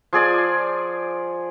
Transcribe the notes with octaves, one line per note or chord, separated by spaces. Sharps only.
F3 G#4 D5 G#5